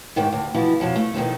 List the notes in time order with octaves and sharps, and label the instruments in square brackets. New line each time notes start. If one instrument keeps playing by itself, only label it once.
[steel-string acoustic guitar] G#2 D#3 G4 E5
D2
B2 E3 F3 E4
F2 B2 F3 F#3
A3
B2 D#3 F3 A3